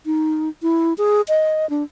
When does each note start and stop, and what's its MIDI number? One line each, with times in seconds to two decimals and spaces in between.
0.06 0.49 63
0.62 0.93 64
0.98 1.21 68
1.28 1.69 75
1.70 1.83 62